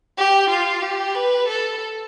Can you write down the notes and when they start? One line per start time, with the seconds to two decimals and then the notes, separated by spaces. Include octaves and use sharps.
0.17 G4
0.50 F4
0.82 G4
1.15 B4
1.48 A4